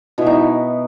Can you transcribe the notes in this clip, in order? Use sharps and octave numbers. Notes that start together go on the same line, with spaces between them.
B2 E4
D#4